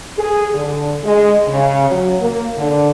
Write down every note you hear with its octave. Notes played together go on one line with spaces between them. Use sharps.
G#4
D3
G#3
C#3
F#3
A#3
D3